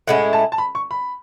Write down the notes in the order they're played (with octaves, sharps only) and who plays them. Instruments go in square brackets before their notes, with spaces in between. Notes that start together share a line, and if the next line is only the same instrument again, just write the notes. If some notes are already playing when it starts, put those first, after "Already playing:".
[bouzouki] A2 G#3 C#4 E4 [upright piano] F#5
[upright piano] A5
A5
B5
C#6
B5